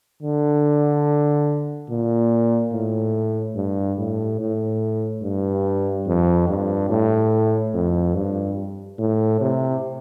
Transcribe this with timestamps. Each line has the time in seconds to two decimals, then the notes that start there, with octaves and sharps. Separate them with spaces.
0.23 D3
1.90 A#2
2.72 A2
3.55 G2
3.98 A2
4.40 A2
5.22 G2
6.07 F2
6.48 G2
6.90 A2
7.74 F2
8.15 G2
8.99 A2
9.40 C3